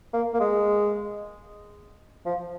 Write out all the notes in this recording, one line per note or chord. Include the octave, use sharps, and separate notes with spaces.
A#3
A#3
G#3
F3